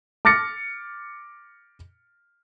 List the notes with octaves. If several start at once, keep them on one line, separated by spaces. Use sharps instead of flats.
D6 F6 A6 A#6 C#7